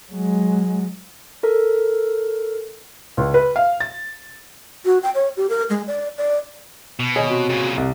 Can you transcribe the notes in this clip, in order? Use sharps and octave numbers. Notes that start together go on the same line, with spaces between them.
F#3 G#3
A4 A#4
C#2
B4
F5
A6
F#4
G5
C#5
G4
A#4
G#3
D5
D5
B2
D#2 G#4 C#5 D#5
C3 F#4
A#2 C#3
C2